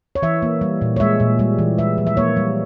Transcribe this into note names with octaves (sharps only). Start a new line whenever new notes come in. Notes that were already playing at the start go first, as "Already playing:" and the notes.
C#5
E3 E5
A#3
G3
A#2
C#5
G#3 E5
A#2
G3
E3
G#3 E5
F3
E5
A#3 C#5
G3